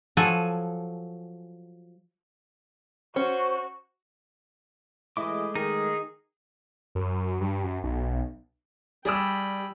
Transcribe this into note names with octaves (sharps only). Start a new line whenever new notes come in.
F3 F#3 A4 F#5 G#5
C#4 F#4 C5
E3 G#3 A3 E4 G#4 D#5 D6
D#3 D#4 G#4
F#2
G2
F#2
B1
G3 G#4 D5 G5 B5 E6